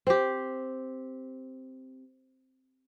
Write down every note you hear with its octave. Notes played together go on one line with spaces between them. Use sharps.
C4 G4